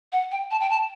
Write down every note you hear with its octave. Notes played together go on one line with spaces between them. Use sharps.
F#5
G5
A5
G5
A5